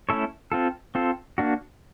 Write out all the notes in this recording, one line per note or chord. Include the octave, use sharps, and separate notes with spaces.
A3 C#4 E4 A4 C#5
C4 F4 A4
C4 F4 A4
A#3 D4 F#4